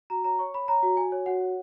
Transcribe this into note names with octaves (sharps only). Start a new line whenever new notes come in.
F#4 A#5
C#5 A#5
C#5 C#6
C#5 B5
C#5 A#5
F#4
F#4 G#5
C#5
F#4 F#5
C#5